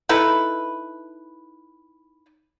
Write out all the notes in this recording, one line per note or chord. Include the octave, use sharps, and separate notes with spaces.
D#4 E4 A4 B4